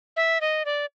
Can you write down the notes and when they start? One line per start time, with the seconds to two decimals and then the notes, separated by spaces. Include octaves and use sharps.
0.16 E5
0.41 D#5
0.65 D5